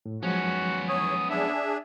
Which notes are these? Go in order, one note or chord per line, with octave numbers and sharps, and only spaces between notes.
A2
F3 F#3 G#3 B3 C#4 F#4
E2 C#5 D#6
D4 G#4 E5